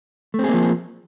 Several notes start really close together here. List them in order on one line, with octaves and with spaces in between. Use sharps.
A3 C4 G#4 A#3 F3